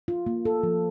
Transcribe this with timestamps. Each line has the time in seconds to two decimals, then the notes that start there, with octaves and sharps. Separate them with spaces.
0.08 F4
0.26 A#3
0.45 A4
0.63 F3